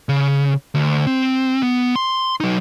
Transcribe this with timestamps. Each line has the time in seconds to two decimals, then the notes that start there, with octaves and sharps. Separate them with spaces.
0.09 C#3
0.75 D2
1.07 C4
1.63 B3
1.96 C6
2.40 F#3 D#4